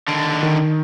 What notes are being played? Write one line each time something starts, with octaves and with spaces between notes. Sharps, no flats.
D#2 D3
D#3